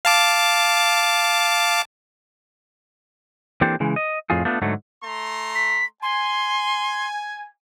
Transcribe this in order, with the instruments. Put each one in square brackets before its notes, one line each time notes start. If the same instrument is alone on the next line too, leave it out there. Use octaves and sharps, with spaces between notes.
[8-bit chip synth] F5 A5 D6
[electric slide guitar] E3 A#3 C4 D4 G4 A4
C#3 E3 G#3
D#5
F2 A2 F4 G#4
A3 B3 D4 F4
G#2 D3 F#3 A3
[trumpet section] A3 A#5 C6
[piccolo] B6
[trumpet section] G#5 [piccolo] C6